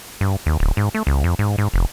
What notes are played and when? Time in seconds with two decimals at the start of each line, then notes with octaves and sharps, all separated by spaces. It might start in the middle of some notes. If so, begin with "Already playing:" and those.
0.21 G2
0.46 D#2
0.60 D1
0.77 G#2
0.95 A3
1.07 C#2
1.24 F2
1.39 G#2
1.58 G#2
1.74 F1